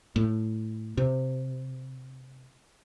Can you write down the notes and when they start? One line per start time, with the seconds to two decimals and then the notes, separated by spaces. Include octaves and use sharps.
0.16 A2
0.98 C3